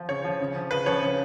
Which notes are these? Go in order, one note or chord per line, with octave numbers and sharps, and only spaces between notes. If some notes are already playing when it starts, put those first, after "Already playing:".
Already playing: F3
C#3 C#5
F3
C#3
F3
C#3 B4
F3 C#5
C#3